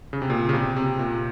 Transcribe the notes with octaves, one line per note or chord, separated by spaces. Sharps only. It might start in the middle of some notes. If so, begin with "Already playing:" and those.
C#3
C3
A#2
C#3
C3
C3
A#2